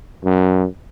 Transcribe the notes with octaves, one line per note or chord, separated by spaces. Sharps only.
F#2